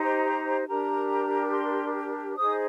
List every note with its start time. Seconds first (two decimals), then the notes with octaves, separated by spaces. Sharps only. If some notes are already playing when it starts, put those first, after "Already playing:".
Already playing: D#4 G4 C5 A#5
0.67 D4 G4 A#4 A#5
1.51 C6
2.36 D#4 G#4 C5 D#6